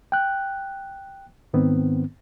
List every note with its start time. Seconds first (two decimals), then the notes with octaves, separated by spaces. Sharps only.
0.12 G5 F#6
1.54 G#2 D#3 B3 C4